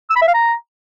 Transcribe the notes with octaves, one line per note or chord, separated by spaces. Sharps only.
E6
B5
E5
F5
A#5